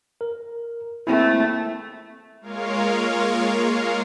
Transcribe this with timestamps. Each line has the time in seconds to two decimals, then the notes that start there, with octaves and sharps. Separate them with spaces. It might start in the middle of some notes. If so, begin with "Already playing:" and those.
0.21 A#4
1.07 A3 A#3 C4 E4
2.41 G#3 A#3 F4 A#4 C#5 F5